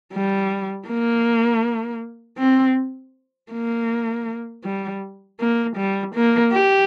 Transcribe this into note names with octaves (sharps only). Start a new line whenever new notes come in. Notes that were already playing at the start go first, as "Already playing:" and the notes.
G3
A#3
C4
A#3
G3
A#3
G3
A#3
G4